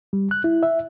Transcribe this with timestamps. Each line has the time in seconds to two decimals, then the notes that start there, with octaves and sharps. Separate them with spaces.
0.13 G3
0.31 F#6
0.44 E4
0.63 E5